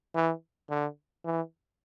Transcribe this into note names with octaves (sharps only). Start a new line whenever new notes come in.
E3
D3
E3